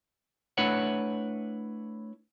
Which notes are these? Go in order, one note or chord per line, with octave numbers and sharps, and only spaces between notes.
A3 D4 E4 B4 C#5 F#5